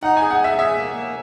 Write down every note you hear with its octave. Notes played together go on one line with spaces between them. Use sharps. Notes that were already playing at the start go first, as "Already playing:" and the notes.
D#4 F#5
G#5
G#4
F#5
G#4 E5
G#4 E5
A#3
A#3